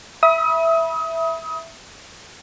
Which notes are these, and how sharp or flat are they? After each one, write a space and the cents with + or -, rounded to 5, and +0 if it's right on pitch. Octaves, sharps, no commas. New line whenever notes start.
E5 +0 B5 -25 D#6 +30